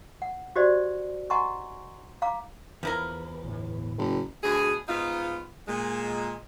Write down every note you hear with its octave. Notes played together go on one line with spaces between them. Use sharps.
F#5
F#4 G4 C5 D5 D#5
D#5 F#5 G#5 A#5 C6 C#6
F5 A#5 D6
E2 F3 E4 A#4 B4
G1 A2
F#1
D2 B2 G#4
G#2 B3 D#4 F4
A#2 G#3